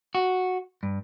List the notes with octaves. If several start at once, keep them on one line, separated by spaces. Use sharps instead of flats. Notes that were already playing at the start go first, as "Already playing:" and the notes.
F#4
G2